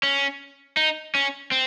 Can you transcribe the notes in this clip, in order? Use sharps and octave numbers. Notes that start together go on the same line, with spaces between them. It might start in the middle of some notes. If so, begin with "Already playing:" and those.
C#4
D#4
C#4
C4